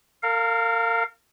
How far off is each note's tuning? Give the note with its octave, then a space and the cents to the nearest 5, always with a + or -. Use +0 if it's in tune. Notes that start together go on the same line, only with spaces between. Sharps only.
A#4 -35 F5 +0